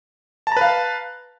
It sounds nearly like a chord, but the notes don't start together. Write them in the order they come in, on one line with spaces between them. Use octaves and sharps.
A5 A#5 B4 F5